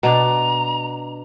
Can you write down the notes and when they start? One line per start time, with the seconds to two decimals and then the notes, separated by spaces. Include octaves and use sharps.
0.03 B2 D4 A#5